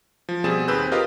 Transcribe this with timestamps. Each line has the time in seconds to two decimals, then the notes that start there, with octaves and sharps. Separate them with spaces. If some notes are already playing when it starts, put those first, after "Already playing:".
0.29 F3
0.44 B2 G3 C4 G#4 A6 E7
0.68 D#2 C4 G#4 B4 E6 G6
0.92 F4 G4 A#4 B4 D#5 F5